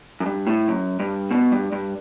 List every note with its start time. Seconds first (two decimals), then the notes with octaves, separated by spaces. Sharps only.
0.20 F#2
0.26 G2
0.47 A2
0.68 F#2
1.00 G2
1.31 B2
1.52 G2
1.72 G2